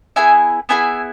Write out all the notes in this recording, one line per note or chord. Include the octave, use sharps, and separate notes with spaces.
B3 E4 G#4 E5 G#5
B3 E4 G#4 E5 G#5